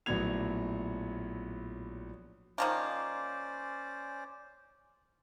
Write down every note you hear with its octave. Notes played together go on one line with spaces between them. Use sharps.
A#1 A2 F#3 B3 G#6 F7
D#3 F3 A#3 C#4 C5 D5